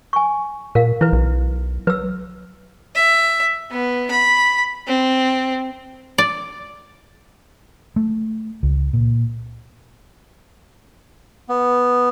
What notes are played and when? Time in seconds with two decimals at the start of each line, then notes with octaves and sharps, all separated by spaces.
0.13 G#5 C#6
0.75 A#2 A#4 F5
1.01 E3 E4 B4
1.13 B1
1.87 F#3 B4 E6
2.95 E5
3.71 B3
4.11 B5
4.87 C4
6.18 D5
7.96 A3
8.63 C#2
8.93 A#2
11.49 B3